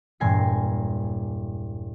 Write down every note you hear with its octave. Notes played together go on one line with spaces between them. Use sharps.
E1 G2 A#2 G#5 A#5 C7